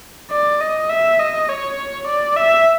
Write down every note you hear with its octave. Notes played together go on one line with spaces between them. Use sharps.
D5
D#5
E5
D#5
C#5
D5
E5